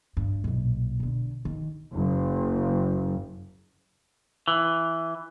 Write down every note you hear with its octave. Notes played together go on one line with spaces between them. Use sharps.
G2
B1 A#2
B2 D3
D#3
F#1
E3